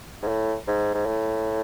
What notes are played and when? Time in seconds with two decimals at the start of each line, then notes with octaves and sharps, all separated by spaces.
0.22 G#2
0.28 A2
0.67 G#2
0.94 G#2
1.06 A2